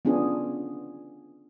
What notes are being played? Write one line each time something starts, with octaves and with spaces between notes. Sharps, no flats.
B3 C#4 D4 F4 G#4